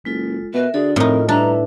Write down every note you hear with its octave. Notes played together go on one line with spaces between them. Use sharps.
F#1 G#3 F4 A4
B2 A#4 B4 E5
D3 F#4 G#4 A4 D5
F2 A2 D#4 F4 A#4
G2 D4 E4 B4 E5 A#5